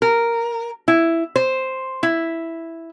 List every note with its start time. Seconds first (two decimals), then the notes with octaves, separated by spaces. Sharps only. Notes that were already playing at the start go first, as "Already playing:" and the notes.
0.02 A#4
0.88 E4
1.36 C5
2.03 E4